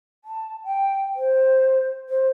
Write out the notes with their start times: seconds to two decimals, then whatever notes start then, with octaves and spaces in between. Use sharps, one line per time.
0.25 A5
0.64 G5
1.16 C5
2.09 C5